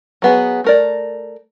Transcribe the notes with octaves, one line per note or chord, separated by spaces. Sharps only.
F#3 B3 G#4
A3 A#4 D5